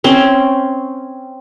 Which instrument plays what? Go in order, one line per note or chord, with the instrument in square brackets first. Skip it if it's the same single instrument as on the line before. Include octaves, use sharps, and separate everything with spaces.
[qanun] C4 C#4